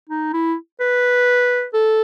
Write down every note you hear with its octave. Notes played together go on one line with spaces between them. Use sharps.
D#4
E4
B4
A4